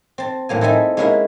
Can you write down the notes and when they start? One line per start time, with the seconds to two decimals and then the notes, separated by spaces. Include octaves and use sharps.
0.18 C4 A5
0.49 A2 F#3 A#3 G#5
0.61 C4 D#4 E4 A4 E5 G#5
0.97 G#3 A#3 C#4 E4 A#4 E5